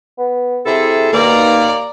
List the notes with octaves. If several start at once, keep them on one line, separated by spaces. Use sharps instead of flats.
B3
C3 E4 G#4 A4
D#2 B2 D#3 A#3 D5 A#5